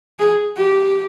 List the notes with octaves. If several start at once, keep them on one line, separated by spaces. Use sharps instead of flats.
G#4
G4